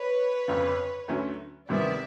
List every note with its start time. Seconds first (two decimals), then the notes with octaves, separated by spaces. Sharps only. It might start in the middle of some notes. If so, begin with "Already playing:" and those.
Already playing: B4 C#5
0.48 G1 F2 C#3
1.08 D2 D3 F#3 A3 C#4
1.69 D2 C3 D#3 G3 B3 D5 E5